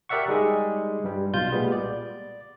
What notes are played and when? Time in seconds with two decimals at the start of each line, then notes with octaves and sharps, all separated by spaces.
0.09 G4 A#4 D5 E5 F#5 C#6
0.28 G3 G#3 D#4 G#4
1.04 G2 G3
1.34 B1 B2 F4 G6
1.52 A#2 G3 G#3 B3
1.72 D5